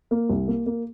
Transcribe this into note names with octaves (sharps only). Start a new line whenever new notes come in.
A#3
C2
A#3
A#3